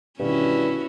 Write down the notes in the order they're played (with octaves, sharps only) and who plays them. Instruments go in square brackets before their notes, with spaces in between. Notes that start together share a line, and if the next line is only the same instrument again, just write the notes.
[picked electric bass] G1 B2 D#3 [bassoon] G2 [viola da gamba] C#4 E4 F#4